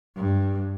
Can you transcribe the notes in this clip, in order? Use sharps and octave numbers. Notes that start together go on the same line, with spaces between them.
G2